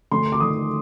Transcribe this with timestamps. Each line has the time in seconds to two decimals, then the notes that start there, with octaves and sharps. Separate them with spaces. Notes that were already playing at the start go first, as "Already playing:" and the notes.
0.12 D2 C6
0.32 D6
0.40 D#3 D#6